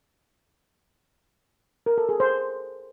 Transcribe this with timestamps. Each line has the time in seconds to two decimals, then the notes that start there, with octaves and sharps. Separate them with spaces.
1.86 A#4
1.98 A4
2.09 G#4
2.20 C5